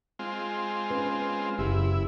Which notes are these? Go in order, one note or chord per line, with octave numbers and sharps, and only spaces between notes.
G#3 C4 F4
C#4 B4
F#1 E4 G4